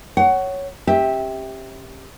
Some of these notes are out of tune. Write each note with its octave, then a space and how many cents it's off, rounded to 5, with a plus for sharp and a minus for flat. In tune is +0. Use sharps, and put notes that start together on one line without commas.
C#5 +0 F#5 +20
C#4 -35 G4 +10 E5 -20